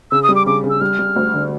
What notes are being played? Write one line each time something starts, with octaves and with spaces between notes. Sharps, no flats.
C#3 E6
D#6
G3
D6
C#3 D6
C#3
E6
G3 F6
G3
D2
D3